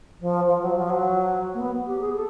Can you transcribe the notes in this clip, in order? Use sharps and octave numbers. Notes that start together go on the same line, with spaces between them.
F3
F3
F#3
F3
F#3
A#3
B3
G4
G#4
A4